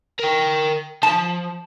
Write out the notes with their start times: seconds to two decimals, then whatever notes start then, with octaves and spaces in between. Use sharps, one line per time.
0.19 A#4 G5
1.03 F3 A5